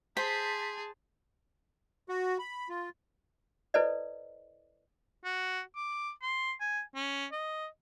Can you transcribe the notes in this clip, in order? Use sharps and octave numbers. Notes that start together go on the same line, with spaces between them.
G#4 C5 A5 B6
F#4
B5
F4
E4 A4 B4 C5 D5 D#5
F#4
D6
C6
G#5
C#4
D#5